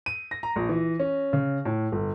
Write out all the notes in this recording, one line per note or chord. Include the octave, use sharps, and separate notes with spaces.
D#7
A#6
A#5
A#1
E3
C#4
C#3
A2
G1